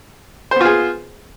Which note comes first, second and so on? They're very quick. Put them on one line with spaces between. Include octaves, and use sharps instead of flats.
C5 B3 F4 G#4